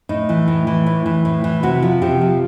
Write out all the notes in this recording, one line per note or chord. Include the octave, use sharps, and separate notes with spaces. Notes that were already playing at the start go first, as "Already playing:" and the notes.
A2 D#4
E3
A2
E3
A2
E3
A2
E3
C3 F#4
F3
C3 G4
F3